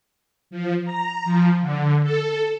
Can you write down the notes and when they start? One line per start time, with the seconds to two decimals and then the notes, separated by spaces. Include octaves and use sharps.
0.51 F3
0.85 A#5
1.25 F3
1.62 D3
2.03 A4